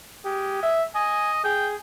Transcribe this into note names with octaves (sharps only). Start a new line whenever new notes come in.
G#3 G4
E5
D#5 G#5
G#4 G5